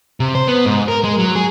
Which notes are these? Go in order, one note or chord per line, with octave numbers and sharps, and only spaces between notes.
C3
C5
B3
G#2
A#4
G#3
F#3
G#4